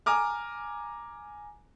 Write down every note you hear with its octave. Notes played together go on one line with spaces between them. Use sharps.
G#5 A#5 D6 F6